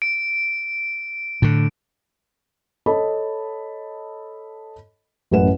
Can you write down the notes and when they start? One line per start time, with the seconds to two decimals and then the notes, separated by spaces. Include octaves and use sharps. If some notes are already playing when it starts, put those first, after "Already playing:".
0.02 D7
1.42 A2 D3
2.86 A4 C#5 D#5 A5 B5
5.31 A1 F#2 B4 F#5 E7